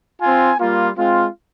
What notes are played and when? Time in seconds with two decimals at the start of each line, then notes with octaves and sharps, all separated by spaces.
0.21 C4 F4 G#5
0.59 G3 A#3 F4
0.97 G#3 C4 F4